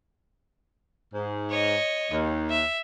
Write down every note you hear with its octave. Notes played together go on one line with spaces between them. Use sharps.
G#2
C#5 D#5
D#2
E5